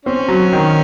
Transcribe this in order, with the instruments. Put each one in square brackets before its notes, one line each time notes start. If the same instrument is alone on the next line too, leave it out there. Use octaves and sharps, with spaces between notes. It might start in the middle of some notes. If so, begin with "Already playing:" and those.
[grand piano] C4 [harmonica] C#4
[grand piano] F#3
D#3